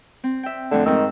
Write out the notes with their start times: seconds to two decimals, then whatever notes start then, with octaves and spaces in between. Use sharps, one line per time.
0.24 C4
0.43 E5 G5
0.71 F2 D3 A3 A4
0.86 G#2 D#3 C4 E6